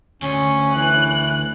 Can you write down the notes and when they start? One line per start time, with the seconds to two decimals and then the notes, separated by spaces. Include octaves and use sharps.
0.22 D2 C#4
0.75 E3 F#6